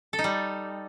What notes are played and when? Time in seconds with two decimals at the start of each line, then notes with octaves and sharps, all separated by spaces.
0.13 A4
0.19 D#4
0.24 G3